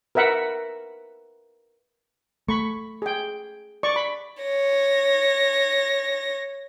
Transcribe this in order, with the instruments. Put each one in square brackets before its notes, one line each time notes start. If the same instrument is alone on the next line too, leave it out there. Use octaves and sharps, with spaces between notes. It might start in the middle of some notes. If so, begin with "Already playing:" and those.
[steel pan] A#4 B4 E5 F#5
[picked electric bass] A3 [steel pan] B5 C#6
[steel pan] G#4 G5
D5 C#6
B5
[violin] C#5 A#6